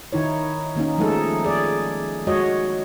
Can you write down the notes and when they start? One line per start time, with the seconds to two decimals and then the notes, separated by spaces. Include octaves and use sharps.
0.13 D#3 D#4 E4 C#5
0.75 D#3 A#3 C#4 D#4
0.98 F3 G#3 A3 D#4 G#4 A4
1.45 G#4 D5
2.27 G#3 F#4 C#5 D#5